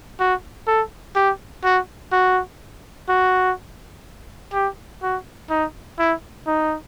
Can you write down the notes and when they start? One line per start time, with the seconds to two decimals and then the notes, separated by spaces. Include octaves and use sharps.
0.19 F#4
0.67 A4
1.16 G4
1.64 F#4
2.12 F#4
3.09 F#4
4.53 G4
5.02 F#4
5.50 D#4
5.99 E4
6.47 D#4